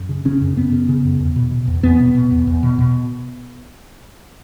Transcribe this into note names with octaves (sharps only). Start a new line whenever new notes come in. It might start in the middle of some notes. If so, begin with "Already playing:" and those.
Already playing: F#2
C#3
C#3 C#4
F#2
F#2 B3
C#3
C#3
F#2
E2
B2
B2
E2
E2 B3
B2
B2
E2
E2
B2
B2